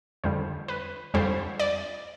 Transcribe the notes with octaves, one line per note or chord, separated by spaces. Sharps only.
F2 D3 G3 C5
B4
F2 D3 G3 C5
D5